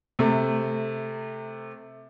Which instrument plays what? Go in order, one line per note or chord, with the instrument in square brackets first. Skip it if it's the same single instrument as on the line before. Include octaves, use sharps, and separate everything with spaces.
[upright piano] C3 A3